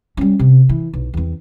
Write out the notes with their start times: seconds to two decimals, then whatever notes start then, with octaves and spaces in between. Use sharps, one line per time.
0.17 G3 C#4
0.39 C3
0.69 E3
0.93 B1
1.14 E2 C4